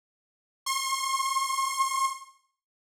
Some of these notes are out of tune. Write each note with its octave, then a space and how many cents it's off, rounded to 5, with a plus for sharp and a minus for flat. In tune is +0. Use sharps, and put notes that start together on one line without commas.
C6 +45